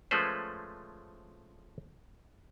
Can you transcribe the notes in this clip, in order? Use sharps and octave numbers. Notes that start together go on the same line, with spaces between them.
F3 G#3 A3 C#4 B4 C5